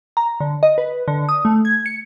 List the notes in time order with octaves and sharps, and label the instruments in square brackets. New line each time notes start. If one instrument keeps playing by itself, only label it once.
[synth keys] A#5
D3
D#5
B4
D3
D#6
A3
G#6
C#7